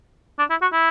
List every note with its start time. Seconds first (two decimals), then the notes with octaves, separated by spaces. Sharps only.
0.39 D4
0.50 E4
0.62 F#4
0.73 E4